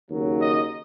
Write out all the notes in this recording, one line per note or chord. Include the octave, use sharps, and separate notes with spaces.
D#2 C#3 F#3
D#5